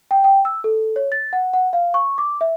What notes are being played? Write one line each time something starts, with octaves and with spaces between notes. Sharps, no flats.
G5
G5
E6
A4
C#5
A6
F#5
F#5
F5
C#6
D6
E5